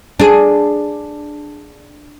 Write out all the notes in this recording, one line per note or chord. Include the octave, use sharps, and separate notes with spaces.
D4 G#4